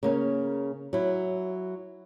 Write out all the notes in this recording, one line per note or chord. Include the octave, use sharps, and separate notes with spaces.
C#3 A#3 C#4
F#3 E4